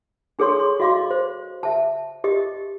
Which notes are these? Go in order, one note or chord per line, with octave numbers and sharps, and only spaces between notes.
D4 G#4 A4 C#5 C6 C#6
C6
F#4 D#5 F5 C6 D6
C5
E5 A5
G4 D#5